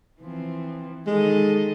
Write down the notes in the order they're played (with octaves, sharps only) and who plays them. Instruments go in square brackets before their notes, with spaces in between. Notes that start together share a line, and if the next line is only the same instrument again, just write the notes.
[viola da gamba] E3 F3 C4
[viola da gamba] D#3 A4 D#5 [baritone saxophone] G#3